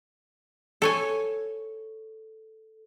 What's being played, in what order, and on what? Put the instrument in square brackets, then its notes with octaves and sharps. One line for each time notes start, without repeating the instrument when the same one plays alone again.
[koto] A4 C#5 G#5